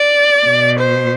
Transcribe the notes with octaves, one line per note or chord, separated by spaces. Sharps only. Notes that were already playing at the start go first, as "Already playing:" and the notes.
Already playing: D5
B2
C5